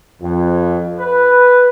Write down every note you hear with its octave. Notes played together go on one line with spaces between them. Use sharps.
F2
B4